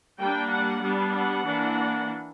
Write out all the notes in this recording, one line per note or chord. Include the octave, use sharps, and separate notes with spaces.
G3 A#3 D4 G5
F#5
G3 B3 D4
F#5
E3 A#3 D4